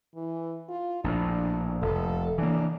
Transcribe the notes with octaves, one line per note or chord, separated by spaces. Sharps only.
E3
F4
A#1 A2 D4
F1 A4
E3 A#3 D4